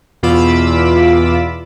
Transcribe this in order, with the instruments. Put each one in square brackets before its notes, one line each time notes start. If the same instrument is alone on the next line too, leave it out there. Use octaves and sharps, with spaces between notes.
[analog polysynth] E2 B2 F4 B5 D6 E6